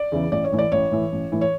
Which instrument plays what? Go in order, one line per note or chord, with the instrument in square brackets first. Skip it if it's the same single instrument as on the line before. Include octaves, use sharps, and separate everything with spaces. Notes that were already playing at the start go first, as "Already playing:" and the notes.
Already playing: [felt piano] D5
E2 C#3 E3
A1 D5
C#5
A2 E3
D5
A1 C#5
A2 E3
A1
A2 E3
C#5